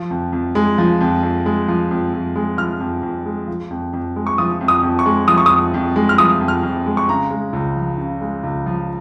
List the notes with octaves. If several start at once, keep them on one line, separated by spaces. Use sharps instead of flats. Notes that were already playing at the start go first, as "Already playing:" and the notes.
Already playing: F3
F2
F2
G#3
F3
F2
F2
G#3
F3
F2
F2
G#3
F3 F6
F2
F2
G#3
F3
F2
F2
G#3
C#6
F3 D#6
F2
D#6
F2
C#6
G#3
F3 D#6
C#6
F2 D#6
F2
G#3
F6
F3 D#6
F2
F6
F2
G#3
C#6
C#3 A#5
G#3
C#2
F3
C#3
G#3
C#2
F3